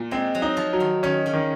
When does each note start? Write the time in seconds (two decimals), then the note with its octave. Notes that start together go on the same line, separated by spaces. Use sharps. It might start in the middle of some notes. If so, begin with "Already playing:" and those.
Already playing: A#2
0.11 G#3 C4
0.35 F#3
0.42 D#4
0.57 F3
0.73 F#3
0.80 D#3
1.03 D#3 C#4
1.26 C#3
1.34 D#3